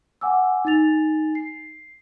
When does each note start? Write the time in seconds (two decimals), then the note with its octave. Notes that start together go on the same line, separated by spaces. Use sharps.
0.21 F#5 G#5 D6 E6
0.65 D#4 G#5 A6 F7
1.35 C7